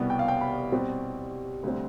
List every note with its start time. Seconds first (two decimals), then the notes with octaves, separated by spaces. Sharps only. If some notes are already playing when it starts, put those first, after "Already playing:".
Already playing: C2 B2 G3 B3
0.10 G5
0.19 F5
0.28 G5
0.41 B5
0.72 B2 G3 C4
1.63 D2 C3 G3 C4